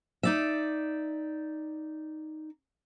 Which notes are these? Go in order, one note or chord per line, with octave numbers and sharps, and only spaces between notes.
D#4 D5 E5